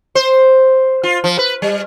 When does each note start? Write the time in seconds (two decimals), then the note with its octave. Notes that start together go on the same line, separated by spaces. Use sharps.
0.15 C5
1.03 F4
1.24 F3
1.39 B4
1.62 G3